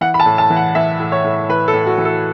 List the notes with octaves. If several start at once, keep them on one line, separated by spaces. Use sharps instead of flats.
E3 F#5
B5
A5
A2
A5
E3
F#5
E3 E5
A2
C#5
A2
E3 B4
A4
A2
F#4
E3
A4